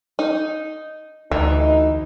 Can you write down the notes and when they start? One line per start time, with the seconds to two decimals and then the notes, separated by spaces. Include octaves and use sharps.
0.19 D#4
1.31 D2 E3 D#4